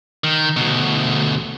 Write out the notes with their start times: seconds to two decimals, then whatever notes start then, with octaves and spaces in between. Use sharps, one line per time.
0.24 D#3
0.57 D2 B2